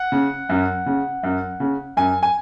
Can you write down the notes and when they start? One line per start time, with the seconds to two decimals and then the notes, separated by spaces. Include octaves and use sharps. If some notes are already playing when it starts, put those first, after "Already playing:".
Already playing: F#5
0.12 C#3
0.49 F#2
0.86 C#3
1.23 F#2
1.60 C#3
1.97 F#2 G#5
2.23 G#5